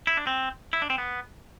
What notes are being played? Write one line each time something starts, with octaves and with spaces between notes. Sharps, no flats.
E4
D4
C4
E4
D4
C4
B3